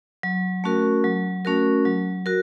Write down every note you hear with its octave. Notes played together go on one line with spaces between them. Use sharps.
F#3
A3 C#4 F#4 A#4
F#3
A3 C#4 F#4 A#4
F#3
F#4 A#4